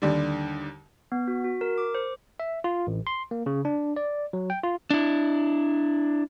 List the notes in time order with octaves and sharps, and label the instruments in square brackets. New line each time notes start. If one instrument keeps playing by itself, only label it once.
[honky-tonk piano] D#2 D3 G3
[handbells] B3
F#4
F#4
A#4
D6
C5
[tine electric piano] E5
F4
A1
C6
A#3
C#3
D4
D5
F#3
G5
F4
[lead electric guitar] D4 E4